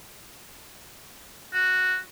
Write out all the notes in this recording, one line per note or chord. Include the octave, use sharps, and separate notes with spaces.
F#4